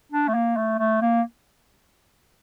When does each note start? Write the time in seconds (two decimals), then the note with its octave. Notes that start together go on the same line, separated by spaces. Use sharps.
0.12 D4
0.28 A3
0.35 A#3
0.57 A3
0.79 A3
1.02 A#3